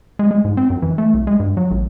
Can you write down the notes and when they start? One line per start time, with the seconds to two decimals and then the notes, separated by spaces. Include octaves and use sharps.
0.19 G#3
0.31 G#3
0.45 G#2
0.57 C4
0.70 F#2
0.82 E3
0.98 A3
1.14 C2
1.27 G#3
1.40 G2
1.57 F#3
1.71 A1